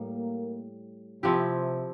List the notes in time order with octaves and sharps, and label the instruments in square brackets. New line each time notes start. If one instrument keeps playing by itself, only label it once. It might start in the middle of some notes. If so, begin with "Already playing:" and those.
Already playing: [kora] A2 G3 [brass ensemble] A#3
[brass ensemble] C3 [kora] F3 C4 E4 G4